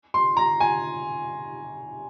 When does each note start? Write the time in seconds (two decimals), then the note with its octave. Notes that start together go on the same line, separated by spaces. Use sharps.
0.14 C6
0.37 A#5
0.60 G#5